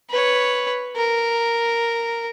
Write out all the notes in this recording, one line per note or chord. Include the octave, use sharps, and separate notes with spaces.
B4 C#5
A#4